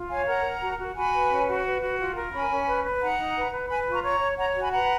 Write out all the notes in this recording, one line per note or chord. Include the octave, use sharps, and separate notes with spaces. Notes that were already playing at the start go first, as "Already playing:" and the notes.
Already playing: F4
C#5 F5 G#5
A#4 F#5 A#5
A#4
F#4
F#4
F#4 G#5 B5
B4
C#4
F#4
B4
F#4
F4
A#4
C#4 G#5 B5
C#4
B4
B4
D#4 F#5 A#5
D#4
B4
B4
B4 G#5 B5
F4
A#5 C#6
C#5 A#5 C#6
C#5
C#5 F#5 A#5
F#4
G#5 B5
B4 F#5 A#5